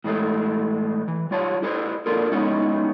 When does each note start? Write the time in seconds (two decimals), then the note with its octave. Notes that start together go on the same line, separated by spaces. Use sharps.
0.04 A2 E3 G#3 A3
1.08 E3
1.31 G3 F4 C#5 A5
1.62 E4 G#4 B4 C5
2.06 A#3 D4 F4 A4 A#4
2.32 G#3 B3 C#4 D#4 E4